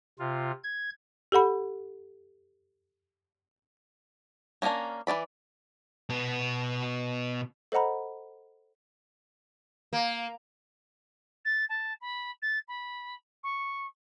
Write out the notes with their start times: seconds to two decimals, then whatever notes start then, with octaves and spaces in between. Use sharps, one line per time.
0.19 C3 F4
0.64 G#6
1.32 G4 A4 F#5 B5
4.62 F#3 A#3 C#4 D4 A#5
5.07 E3 C#4 D5 B5
6.10 B2 B3
7.72 A4 C5 D#5 F#5 A#5 B5
9.93 A#3
11.45 A6
11.69 A5
12.01 B5
12.42 A6
12.68 B5
13.43 C#6